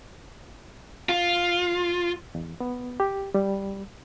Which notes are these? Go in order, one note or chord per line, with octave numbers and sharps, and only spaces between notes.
F4
E2
B3
G4
G3